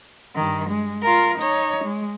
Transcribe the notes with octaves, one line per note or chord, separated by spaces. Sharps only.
G2 D#3
G#3
F4 A#4
D#4 C#5
G#3